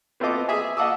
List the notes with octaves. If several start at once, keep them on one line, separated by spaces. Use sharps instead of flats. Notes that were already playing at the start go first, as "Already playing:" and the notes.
B3 C4 F4 A4 D#5 D6
G#4 E5 G#5
D#5 F5 F#5 A5 D6 E6